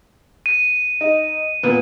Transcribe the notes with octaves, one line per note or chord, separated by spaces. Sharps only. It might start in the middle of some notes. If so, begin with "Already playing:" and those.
D#7
D#4
A#2 B3